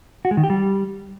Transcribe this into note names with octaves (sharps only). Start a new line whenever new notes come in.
F#4
G#3
D#3
G4
G3